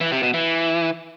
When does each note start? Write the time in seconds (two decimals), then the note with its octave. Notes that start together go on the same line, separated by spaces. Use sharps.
0.01 E3
0.12 C3
0.23 B2
0.34 E3